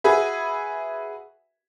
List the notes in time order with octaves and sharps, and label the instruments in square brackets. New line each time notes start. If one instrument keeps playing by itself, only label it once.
[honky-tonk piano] F#4 G#4 B4 E5